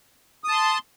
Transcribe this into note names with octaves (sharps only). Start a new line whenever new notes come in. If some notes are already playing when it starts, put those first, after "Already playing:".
A5 C6 D#6